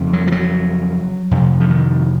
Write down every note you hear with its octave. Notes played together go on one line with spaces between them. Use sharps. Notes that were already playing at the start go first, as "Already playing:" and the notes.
Already playing: F2 C#3
F#3
F3
F#3
F2 C3
F3
D#3